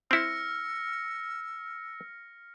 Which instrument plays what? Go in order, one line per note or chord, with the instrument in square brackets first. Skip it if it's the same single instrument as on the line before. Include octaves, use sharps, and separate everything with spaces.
[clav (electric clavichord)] C4 E4 [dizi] E6 [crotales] F6 A#6 C#7